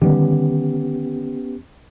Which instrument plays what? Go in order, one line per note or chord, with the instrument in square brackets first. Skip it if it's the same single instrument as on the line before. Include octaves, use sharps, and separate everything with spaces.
[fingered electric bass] D3 D#3 G3 [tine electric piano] B3 C#4 G4